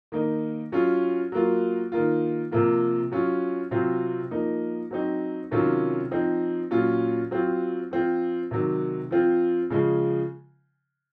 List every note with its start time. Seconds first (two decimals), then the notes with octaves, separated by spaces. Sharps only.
0.12 D#3 A#3 D#4
0.72 F#3 C#4 F4
1.32 F#3 A#3 F4
1.92 D#3 A#3 F4
2.51 C3 F3 A#3 F4
3.12 F#3 C#4 F4
3.71 C3 F#3 C4 F4
4.31 F3 A#3 D#4
4.91 F#3 C4 D#4
5.51 C3 D#3 F#3 C#4 F4
6.11 F3 C4 D#4
6.71 A#2 F#3 C#4 F4
7.31 F#3 C4 F4
7.91 F3 C4 F4
8.51 C3 D#3 F#3
9.11 F3 C4 F4
9.70 C#3 F3 G#3